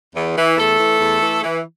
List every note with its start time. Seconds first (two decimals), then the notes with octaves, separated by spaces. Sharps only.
0.15 E2
0.37 E3
0.57 E2 A3 A4
0.79 E3
1.00 E2
1.22 E3
1.43 E3